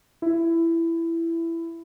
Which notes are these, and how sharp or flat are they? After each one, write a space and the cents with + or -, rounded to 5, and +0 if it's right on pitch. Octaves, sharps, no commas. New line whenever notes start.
E4 +15